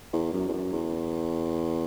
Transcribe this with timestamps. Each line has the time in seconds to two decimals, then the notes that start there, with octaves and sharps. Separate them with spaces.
0.13 E2
0.33 F#2
0.48 E2
0.53 F#2
0.73 E2